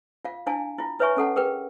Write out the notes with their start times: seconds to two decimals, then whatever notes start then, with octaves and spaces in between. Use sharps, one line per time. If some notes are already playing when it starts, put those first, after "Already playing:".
0.25 F4 F5
0.46 D4 E4 F5 G#5 A5
0.78 E4 F4
0.99 E4 B4 C#5 E5 G#5 C#6
1.17 C#4 A4 F#5 A5
1.36 G#4 A#4 B4 G5